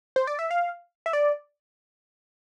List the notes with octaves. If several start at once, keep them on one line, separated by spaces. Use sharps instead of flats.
C5
D5
E5
F5
E5
D5